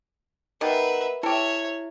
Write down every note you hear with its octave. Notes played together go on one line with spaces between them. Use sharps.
B2 G3 D#4 A#4 B4 E5 F#5
E4 G4 A4 C#5 E5